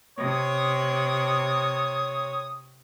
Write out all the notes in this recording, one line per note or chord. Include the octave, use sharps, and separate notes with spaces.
C3 C#5 D#6